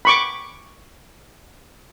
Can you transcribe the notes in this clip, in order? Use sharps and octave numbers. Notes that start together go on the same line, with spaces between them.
B5 C#6 D6